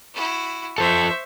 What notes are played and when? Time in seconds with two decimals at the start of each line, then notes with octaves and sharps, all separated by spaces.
0.14 E4 F#4
0.78 F3 A4 C5 E5 C#6